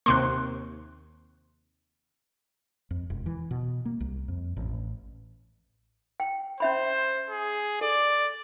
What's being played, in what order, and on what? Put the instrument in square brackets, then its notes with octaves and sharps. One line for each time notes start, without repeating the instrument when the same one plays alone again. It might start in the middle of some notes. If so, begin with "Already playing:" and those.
[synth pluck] D#2 C3 A#3 [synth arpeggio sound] C6 C#6 F#6
[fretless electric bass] F2
E1
E3
B2
A#3
C2
F2
A1
[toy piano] G5
[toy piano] C#4 E5 B5 [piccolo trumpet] C5
[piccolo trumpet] G#4
[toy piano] A4 [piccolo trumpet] D5